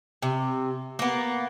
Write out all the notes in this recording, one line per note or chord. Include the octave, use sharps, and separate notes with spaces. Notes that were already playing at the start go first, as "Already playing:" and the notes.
C3
A#3 B3